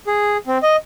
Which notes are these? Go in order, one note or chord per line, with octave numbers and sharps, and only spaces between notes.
G#4
C4
D#5